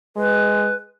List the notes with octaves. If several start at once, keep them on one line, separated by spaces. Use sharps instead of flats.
G#3 B4